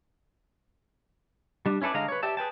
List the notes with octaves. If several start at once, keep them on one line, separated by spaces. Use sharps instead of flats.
G3 D4
C#4 E4 A4 B4 D5
D3 G#3 D#5 F5 A#5
B4 C#5
G4 D5 E5 A5
G#4 B4 G5 A5